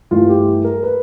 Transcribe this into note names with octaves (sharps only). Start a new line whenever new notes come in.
G2 E3 A3 F4
G4
A#4
B4